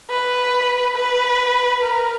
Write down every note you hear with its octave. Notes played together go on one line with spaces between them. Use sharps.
B4
B4
A#4